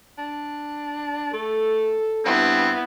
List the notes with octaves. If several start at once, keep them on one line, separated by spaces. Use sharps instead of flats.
D4
A3 A4
G2 B3 C4 E4